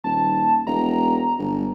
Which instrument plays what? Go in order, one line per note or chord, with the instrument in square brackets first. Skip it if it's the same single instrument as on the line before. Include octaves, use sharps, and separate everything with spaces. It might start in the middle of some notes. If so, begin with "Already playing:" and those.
[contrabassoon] D#1 [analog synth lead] A5
[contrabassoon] E1 [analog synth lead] A#5
[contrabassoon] G1